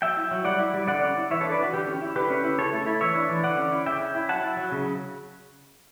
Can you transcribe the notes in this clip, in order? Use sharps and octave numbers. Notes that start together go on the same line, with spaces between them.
F#3 E5 G5
E4
F#3
G3 D5 F#5
E4
G3
D3 D5 F#5
C#4
E4
E3 C#5 E5
D4 A4 C#5
B4 D5
E3 F#4
D3 G4
C#4
E4
D3 G4 B4
C#4
E4
C#3 A4 C#5
A3
E4
E3 C#5 E5
D4
E3
D3 D5 F#5
C#4
E4
C#3 E5 G5
C#4
E4
F#3 F#5 A5
E4
F#3
C#3